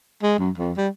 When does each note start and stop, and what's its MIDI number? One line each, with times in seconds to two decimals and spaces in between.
0.23 0.37 56
0.39 0.51 42
0.57 0.72 41
0.77 0.88 55